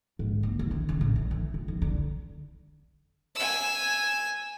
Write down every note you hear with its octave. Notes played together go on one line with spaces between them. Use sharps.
G#2
A#3
D2
D#3
C#3
A2
D3
E3
F3
D#2
D3
G#5 E6